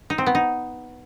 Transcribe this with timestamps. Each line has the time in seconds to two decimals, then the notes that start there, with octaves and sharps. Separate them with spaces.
0.10 D#4
0.18 C4
0.26 B3
0.35 D#4